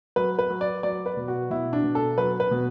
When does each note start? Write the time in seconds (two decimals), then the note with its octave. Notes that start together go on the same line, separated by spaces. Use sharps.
0.16 F#3 B4
0.39 B4
0.50 F#3
0.61 D5
0.83 F#3 D5
1.06 B4
1.17 B2
1.28 F#4
1.50 B2 E4
1.73 D4
1.84 B2
1.95 A4
2.18 F#3 B4
2.40 B4
2.51 B2